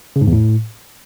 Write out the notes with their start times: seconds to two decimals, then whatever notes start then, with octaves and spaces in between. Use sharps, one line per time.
0.16 C#3
0.21 G#2
0.27 E2
0.32 A2